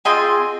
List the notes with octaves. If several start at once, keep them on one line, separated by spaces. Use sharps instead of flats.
C4 F4 G#4 D#5 G5